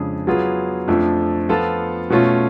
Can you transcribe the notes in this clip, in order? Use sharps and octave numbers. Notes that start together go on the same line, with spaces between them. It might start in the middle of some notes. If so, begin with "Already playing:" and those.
Already playing: F2 C#3 G#3 D4 G#4
F#3 B3 F4 G#4
F2 F3 A3 D4
F3 B3 F4 A4
B2 A3 C#4 F4